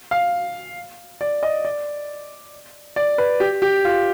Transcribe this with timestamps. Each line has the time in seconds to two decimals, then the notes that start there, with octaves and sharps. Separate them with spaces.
0.11 F5
1.21 D5
1.43 D#5
1.65 D5
2.96 D5
3.18 B4
3.40 G4
3.62 G4
3.85 F4